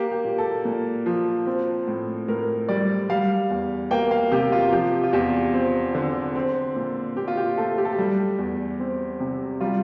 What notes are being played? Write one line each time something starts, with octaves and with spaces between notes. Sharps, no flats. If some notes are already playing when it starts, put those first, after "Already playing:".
Already playing: A#3 G4
G4
A#2
A4
A#2
F3
C4
A2
A2 A#4
G3 D5
G3 F5
E2
A#3 G5
F5
C3 G4
F4
F3 G4
F4
E2 G4
C4
D3
C4
A#2
A#2 G4
F4
G4
A3 A4
G4
A4
G4
G3
E2
C4
C3
G3 F4